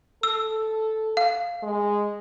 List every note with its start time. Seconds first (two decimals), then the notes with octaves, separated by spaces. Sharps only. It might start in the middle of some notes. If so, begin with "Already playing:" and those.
0.23 A4 E6
1.17 F5
1.63 G#3